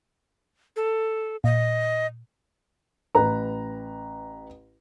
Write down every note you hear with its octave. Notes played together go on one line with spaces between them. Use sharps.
A4
A#2 D#5
A1 B4 A#5